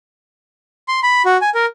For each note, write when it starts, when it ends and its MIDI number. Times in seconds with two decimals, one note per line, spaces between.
0.88 1.00 84
1.03 1.22 83
1.26 1.37 66
1.41 1.50 80
1.55 1.66 70